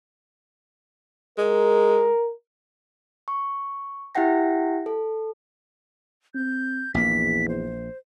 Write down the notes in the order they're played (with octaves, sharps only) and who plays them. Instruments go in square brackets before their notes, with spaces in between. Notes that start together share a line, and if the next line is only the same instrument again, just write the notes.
[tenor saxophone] G#3 [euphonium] A#4
[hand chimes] C#6
E4 G4 E5 F#5 G5 A#6
A4
[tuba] C4 [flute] G6
[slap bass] A#1 A#3 [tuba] E2 [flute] B6
[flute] C5